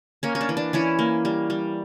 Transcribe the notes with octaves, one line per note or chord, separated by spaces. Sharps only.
A#3 C#4
C#4
D4
E3
D4
E3 C#4 E4
A#3
G3
G3